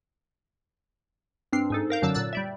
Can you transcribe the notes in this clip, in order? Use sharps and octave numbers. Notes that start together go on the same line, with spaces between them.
G2 C4 D4 F6 C7
G#2 D#4 A4
A#4 F5 G6
F#2 D3 F#3 A5 D6 E6
A#2 E6 F#6 A6
G3 D5 E5